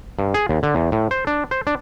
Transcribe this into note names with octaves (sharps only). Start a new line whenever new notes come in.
G2
G#4
D#2
D3
E2
A2
C5
D4
C5
D4